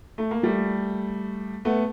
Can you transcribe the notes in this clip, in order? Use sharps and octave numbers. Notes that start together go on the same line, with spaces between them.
A3
A#3
G3 A3
A3 B3